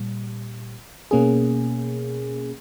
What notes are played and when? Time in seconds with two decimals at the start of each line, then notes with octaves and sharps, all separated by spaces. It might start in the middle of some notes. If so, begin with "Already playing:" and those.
Already playing: A#2 G3
1.11 B2 A#3 C#4 G#4